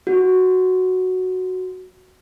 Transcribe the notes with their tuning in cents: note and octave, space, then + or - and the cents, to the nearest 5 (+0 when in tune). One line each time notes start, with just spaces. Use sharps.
F#4 +0